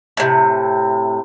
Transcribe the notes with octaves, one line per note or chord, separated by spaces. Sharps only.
A2 C3